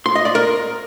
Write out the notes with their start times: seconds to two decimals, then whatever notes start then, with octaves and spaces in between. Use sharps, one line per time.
0.06 C6
0.15 D#5
0.25 D5
0.35 A#4